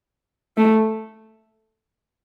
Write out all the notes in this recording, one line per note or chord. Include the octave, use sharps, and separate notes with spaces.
A3